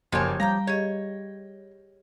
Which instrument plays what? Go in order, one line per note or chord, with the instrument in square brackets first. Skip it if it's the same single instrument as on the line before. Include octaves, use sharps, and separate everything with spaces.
[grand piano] F#1 A#3 G#5 [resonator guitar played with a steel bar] F3 G4 C#5 [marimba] C6
[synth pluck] G3 G5 [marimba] F5 A#5 G6 [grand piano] A#6
[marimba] G4 G#4 D#5 [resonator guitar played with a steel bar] C#5